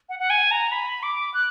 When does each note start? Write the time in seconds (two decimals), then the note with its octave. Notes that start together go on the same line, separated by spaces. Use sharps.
0.09 F#5
0.19 F#5
0.30 G#5
0.51 A#5
0.72 B5
1.03 D6
1.34 F#6